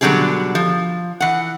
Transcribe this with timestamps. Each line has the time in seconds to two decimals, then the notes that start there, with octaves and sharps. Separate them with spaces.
0.01 B2 D3 F#3 G3 D4 G#4
0.55 F3
1.20 E3 F#5